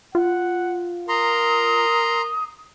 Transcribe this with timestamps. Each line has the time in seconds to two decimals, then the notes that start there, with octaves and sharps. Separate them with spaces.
0.15 F4 F#5
1.09 A#4 A#5 C6 D#6